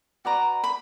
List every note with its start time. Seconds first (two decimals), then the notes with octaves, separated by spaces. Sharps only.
0.25 F#4 B4 D5 A#5
0.64 B5